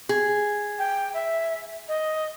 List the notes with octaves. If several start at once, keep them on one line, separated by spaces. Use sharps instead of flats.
G#4
G5
E5
D#5